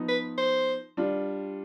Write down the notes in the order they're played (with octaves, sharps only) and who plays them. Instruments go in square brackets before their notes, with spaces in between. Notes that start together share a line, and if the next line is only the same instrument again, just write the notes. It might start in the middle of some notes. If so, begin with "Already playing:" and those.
Already playing: [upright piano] F3 B3 D#4
[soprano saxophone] B4
C5
[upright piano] G3 D4 F4